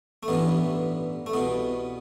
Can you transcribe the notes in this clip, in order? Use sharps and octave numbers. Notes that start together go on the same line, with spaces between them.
A3
A1 G2 E3 B3
A3
C2 B2 B3